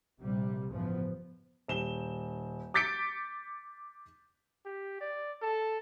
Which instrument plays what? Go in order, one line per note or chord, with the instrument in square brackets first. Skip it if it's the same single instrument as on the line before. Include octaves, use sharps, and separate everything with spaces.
[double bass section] A#1 C3 G3
A1 G2 C#3 F3 B3
[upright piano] D#1 E7 G7
D6 G6 A6 B6 C#7 D7
[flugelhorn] G4
D5
A4